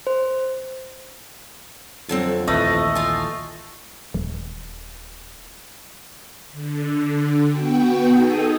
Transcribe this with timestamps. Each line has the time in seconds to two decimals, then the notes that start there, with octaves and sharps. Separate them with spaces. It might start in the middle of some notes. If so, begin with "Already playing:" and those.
0.07 C5
2.09 F2 D3 F#3 C4
2.47 A#1 D#2 E3 A3 B4 D#5
2.95 F4 G#5
4.14 D#1
6.52 D3
7.49 B3 F#4 G5
8.11 D#4 G#4 A4 D#6